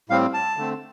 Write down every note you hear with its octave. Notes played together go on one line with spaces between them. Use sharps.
A2 G3 C4 F5
A5
D3 A3 C4